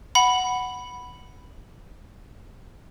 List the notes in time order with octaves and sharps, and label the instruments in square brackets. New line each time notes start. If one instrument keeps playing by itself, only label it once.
[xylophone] F#5 B5